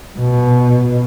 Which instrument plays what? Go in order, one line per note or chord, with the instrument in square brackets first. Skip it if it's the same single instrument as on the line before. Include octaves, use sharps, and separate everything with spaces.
[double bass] B2